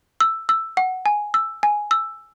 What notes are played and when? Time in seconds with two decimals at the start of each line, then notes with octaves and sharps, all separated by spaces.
0.21 E6
0.49 E6
0.77 F#5
1.06 G#5
1.34 E6
1.63 G#5
1.91 E6